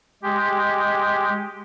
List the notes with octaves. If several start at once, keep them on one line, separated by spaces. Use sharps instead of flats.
G#3 G4